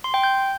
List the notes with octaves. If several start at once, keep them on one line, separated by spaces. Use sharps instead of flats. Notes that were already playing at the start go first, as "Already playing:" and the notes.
C6
G5
G6